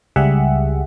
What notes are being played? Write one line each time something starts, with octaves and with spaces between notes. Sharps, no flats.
C#2 G3 G4 G#4 E5 F#5